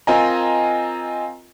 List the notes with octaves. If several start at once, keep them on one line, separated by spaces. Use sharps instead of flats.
C4 F4 A#4 D#5 G#5 A#5